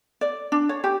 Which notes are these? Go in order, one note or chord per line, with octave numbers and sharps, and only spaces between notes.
D5
D4
C#5
G4